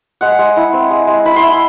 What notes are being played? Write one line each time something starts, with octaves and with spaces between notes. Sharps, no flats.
G#3 F#5
G#3
E4
C4
G#3
G#3
E4 B5
C6
E4
B5